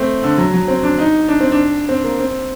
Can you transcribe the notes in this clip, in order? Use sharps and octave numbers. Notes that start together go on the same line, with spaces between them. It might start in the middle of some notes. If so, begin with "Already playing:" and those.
Already playing: A3 C4
D3
F#3
F#3
C4
D4
D#4
D4
C4
D4
C4
A#3
C4